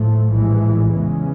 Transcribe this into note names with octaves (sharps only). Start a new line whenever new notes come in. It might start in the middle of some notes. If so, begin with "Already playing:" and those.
Already playing: A2 F3 A3
A#1 A2 E3 G#3
E2 C#3 E3 G#3 C#4